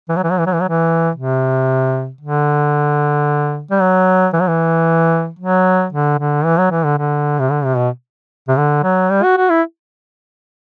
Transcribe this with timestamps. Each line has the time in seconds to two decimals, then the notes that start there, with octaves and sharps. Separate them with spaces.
0.09 E3
0.17 F#3
0.24 E3
0.31 F#3
0.39 E3
0.46 F#3
0.54 E3
0.61 F#3
0.69 E3
1.15 C3
2.21 D3
3.71 G3
3.80 F#3
4.33 E3
4.40 F#3
4.47 E3
5.39 F#3
5.93 D3
6.19 D3
6.45 E3
6.58 F#3
6.71 E3
6.85 D3
6.98 D3
7.39 C3
7.51 D3
7.64 C3
7.77 B2
8.48 C3
8.57 D3
8.83 F#3
9.10 G3
9.23 F#4
9.37 F#4
9.50 E4